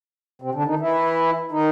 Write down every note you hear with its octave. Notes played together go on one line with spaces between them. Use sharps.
C3 C4
D3 D4
D#3 D#4
E3 E4
D#3 D#4